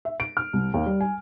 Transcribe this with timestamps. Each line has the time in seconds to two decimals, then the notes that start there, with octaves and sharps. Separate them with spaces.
0.05 E5
0.20 D7
0.37 F6
0.53 C2
0.74 D#2
0.86 G3
1.01 G#5